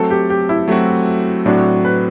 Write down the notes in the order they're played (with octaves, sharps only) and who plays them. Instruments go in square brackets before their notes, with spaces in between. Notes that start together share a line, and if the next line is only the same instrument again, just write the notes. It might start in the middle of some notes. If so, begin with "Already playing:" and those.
Already playing: [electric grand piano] F#3 A3 C4 F#4 [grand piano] A4
[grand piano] G4
G4
E4
[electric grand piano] F#3 A3 C4 F#4
[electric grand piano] A2 F#3 C4 F#4 [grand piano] D4
[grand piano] B4